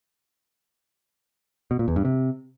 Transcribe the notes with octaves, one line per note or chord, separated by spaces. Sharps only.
B2
A#2
E2
G2
C3